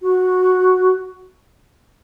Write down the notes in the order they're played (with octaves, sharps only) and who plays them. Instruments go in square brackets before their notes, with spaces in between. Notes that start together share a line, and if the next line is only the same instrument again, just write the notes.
[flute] F#4